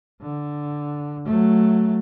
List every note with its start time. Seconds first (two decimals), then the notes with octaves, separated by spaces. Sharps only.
0.21 D3
1.26 F#3 A3